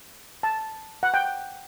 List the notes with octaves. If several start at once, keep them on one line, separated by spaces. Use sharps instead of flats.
A5
F#5
G5